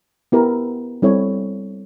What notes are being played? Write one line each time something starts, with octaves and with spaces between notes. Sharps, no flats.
B3 E4 G4 A#4
G3 C4 E4 A4 C#5